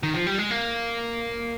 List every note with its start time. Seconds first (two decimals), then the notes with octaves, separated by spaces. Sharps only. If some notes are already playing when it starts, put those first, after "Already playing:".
0.03 D#3
0.14 F3
0.27 G3
0.38 G#3
0.51 A#3